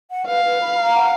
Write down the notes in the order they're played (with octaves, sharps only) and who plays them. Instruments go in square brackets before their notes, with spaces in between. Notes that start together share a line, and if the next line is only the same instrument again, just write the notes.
[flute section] F#5
[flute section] B4 [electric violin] F5
[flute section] B4
B5
A#5
F#5